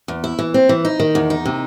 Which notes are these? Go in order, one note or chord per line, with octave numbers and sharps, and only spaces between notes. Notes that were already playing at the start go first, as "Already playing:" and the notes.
E2
E4
E3
C4
E3
D#4
D#3
E2
D#4
C3